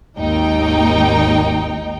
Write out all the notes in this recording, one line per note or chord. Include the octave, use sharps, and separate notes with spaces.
G#1 D#2 D#4 G5